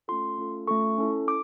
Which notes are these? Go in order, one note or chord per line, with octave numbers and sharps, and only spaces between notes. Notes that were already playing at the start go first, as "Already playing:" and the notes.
A3 C#4 F4 A4 C6
A3 C#4 F4 A4
A3 C#4 F4 A4 C#6
C#4 E4 A4
D6